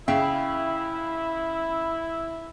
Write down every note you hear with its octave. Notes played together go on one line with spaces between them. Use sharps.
C#3 E4 E5 F5 G5